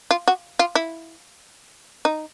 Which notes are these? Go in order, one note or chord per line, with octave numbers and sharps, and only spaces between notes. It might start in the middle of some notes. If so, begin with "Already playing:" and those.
F4
F#4
F4
E4
D#4